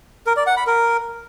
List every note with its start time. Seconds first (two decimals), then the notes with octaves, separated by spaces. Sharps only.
0.26 A#4
0.37 D5
0.47 F#5
0.57 B5
0.67 A#4